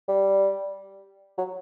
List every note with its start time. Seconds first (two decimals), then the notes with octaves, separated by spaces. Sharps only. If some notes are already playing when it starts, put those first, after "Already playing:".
0.08 G3
1.38 F#3